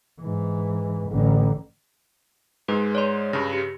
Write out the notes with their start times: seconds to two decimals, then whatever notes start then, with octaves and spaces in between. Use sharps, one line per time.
0.21 G#2 E3
1.10 A1 D3
2.68 G#2 G#3 B4
2.95 C#5 D5 C6
3.33 G2 C#3 A#6
3.53 G4